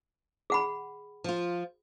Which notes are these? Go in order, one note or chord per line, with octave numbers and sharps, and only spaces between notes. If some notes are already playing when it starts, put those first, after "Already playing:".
G#4 F#5 B5
F3 F4